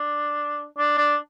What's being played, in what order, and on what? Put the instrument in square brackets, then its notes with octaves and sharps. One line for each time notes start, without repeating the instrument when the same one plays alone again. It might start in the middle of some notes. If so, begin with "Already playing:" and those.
Already playing: [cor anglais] D4
D4
D4